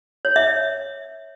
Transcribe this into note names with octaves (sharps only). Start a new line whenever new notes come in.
C#5
E5
C#5